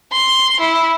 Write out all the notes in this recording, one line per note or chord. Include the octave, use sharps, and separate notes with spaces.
C6
E4